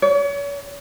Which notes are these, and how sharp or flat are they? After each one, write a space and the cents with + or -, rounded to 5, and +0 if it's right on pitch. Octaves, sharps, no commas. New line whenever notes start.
C#5 +40